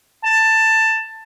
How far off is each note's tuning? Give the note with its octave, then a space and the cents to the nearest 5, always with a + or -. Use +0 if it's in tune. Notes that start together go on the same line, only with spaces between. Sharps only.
A5 +10